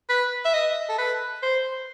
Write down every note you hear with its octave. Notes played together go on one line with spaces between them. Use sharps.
B4
E5
D#5
A4
B4
C5